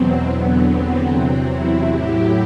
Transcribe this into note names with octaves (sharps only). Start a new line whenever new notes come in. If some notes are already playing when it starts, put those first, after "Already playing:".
Already playing: E2 B2 F#3 C4
E2 D3 F#3 B3
C4
E2 C3 F#3
C4 E4
A2 F#3 E4 G4